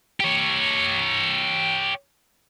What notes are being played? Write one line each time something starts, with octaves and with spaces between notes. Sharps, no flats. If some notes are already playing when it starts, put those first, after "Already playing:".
G4 C#5